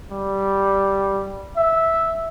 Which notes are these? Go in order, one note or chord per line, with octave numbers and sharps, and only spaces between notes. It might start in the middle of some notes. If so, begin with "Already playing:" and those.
G3
E5